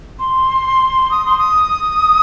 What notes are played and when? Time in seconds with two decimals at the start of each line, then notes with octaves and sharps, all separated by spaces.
0.19 C6
1.11 D#6
1.26 C6
1.38 D#6